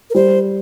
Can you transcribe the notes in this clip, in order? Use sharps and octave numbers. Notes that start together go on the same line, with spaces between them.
A#4
G3 C5